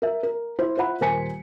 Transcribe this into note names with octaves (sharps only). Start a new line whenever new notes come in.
A#4 E5
A#4
E4 C5
F4 C5 E5 F#5 B5
D#1 A#4 C5 G#5 B6 C#7